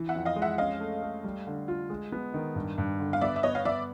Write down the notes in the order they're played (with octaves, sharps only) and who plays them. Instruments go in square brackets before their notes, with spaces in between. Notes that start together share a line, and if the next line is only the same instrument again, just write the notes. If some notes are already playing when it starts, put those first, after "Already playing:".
Already playing: [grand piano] E3
[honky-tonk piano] E5 F#5
[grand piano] F2
[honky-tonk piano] D#5 F5
[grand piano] G#3
[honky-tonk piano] E5 F#5
[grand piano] C#4 [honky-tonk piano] D#5 F5
[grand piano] A3
A3
G3
D3
F4
G#3
B3
D#3
G2
G2
D3
[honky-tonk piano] F5
[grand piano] B3 [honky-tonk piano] D5 E5
[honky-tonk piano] E5
[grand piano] B3 [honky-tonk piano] C#5 D#5
[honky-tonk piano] F5
[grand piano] B3 [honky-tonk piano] D5 E5